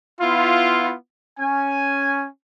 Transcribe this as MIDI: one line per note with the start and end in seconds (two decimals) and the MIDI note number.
0.21 0.94 59
0.21 0.94 64
0.21 0.94 65
1.40 2.26 61
1.40 2.26 80